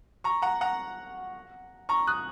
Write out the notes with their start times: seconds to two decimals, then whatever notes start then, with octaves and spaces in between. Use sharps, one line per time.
0.24 A#5 C#6
0.42 F#5 A#5
0.61 F#5 A#5
1.89 A#5 C#6
2.07 D#6 F#6